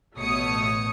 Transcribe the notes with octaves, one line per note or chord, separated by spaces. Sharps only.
A1 B2 A3 C#5 D#6 C#7